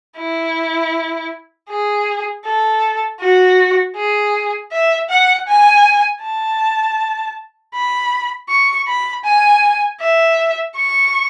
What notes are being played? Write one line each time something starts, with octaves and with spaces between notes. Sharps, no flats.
E4
G#4
A4
F#4
G#4
E5
F#5
G#5
A5
B5
C#6
B5
G#5
E5
C#6